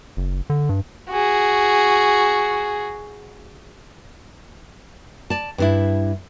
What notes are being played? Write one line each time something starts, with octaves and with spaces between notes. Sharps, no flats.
F#1
D3
G2
F#4 G#4
D5 A5
G2 D4 E4